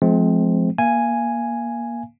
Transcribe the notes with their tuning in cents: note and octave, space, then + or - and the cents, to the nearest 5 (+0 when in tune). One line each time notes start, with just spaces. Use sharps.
F3 +0 G#3 +40 C4 +0
A#3 +20 F5 -35 G#5 +0